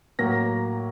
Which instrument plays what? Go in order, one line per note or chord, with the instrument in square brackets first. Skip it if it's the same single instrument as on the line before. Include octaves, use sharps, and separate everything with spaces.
[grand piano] A2 F#3 A#3 A#6